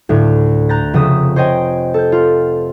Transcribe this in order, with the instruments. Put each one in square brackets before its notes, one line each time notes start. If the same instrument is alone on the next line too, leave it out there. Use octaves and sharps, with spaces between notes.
[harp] D2 A2
A#5 F#6 G6 A6 A#6
F1 C#3 E5 D#6
C5 C#5 D#5 G5 G#5
A4 G6
F4